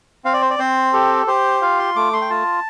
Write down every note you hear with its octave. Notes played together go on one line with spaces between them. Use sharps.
C4 F5
D5
C5
D5
C4 C5
G4 A4
G4 C5
F4 F5
C6
A3 D6
C6
G5
F4 A5